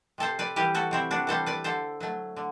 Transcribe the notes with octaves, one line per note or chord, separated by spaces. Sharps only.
C3 A4 C5
B4 D5
E3 G3 G4 B4
F#4 A4
C3 C4 E4
D4 F#4
E3 G3 A4 C5
B4 D5
D3 A4 C5
F#3 A3
D3